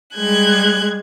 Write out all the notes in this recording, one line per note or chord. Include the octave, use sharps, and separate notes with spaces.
G3 G#3 F#6 G#6